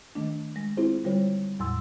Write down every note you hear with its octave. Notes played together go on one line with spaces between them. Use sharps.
D#3 A3 D4
G#3 A#6
C4 E4 F4 G#4 C5
D3 G3 F4 C5 C#5
E2 A2 F#3 C6 E6